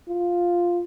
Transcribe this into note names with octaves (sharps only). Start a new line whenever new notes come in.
F4